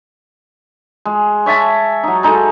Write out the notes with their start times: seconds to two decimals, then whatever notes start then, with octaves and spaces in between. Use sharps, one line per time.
1.05 G#3
1.46 C#5 E5 G#5 A5
2.03 F#3 D#4
2.23 G#3 D#4 A4